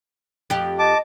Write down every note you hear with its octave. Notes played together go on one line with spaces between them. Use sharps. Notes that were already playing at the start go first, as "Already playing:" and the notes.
F2 G4
D#5 A5 D6